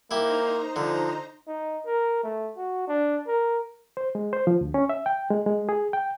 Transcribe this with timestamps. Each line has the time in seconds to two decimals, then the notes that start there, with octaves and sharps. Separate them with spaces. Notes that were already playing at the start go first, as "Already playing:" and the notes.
0.11 A#3 D#4 E4 G4 C5 A#5
0.76 D3 F3
1.48 D#4
1.86 A#4
2.23 A3
2.57 F#4
2.88 D4
3.27 A#4
3.97 C5
4.15 G#3
4.33 C5
4.47 F3
4.61 D2
4.74 C#4
4.89 E5
5.06 G5
5.30 G#3
5.46 G#3
5.69 G#4
5.93 G5